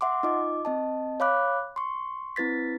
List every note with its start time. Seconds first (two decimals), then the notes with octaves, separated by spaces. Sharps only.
0.01 E5 F#5 C6 D6
0.23 D#4 F4 D#5 D6
0.65 C4 D#5 A5
1.20 C#5 F5 B5 D6 F#6
1.76 C6 C#6
2.36 C4 E4 B4 A6 B6